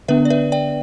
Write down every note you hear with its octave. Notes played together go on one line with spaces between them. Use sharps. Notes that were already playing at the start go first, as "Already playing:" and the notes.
D3 B3 D4 B4 E5
D5
B4 E5
D5 G5